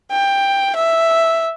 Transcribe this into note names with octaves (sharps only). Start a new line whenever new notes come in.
G5
E5